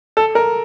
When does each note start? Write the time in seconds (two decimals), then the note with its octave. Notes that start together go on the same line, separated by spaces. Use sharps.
0.17 A4
0.35 A#4